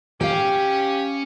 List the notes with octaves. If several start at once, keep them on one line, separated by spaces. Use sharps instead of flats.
C#4 G4 F5 G5